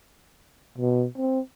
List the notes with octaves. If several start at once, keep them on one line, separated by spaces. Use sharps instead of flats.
B2
C4